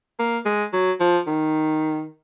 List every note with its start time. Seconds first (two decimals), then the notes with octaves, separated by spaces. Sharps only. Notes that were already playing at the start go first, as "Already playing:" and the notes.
0.19 A#3
0.46 G#3
0.73 F#3
1.00 F3
1.27 D#3